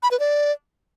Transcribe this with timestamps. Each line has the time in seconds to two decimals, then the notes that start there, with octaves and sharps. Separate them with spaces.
0.03 B5
0.11 B4
0.20 D5